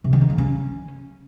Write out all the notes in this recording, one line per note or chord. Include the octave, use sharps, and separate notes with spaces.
C3
D#3
D#4
C#3
C#4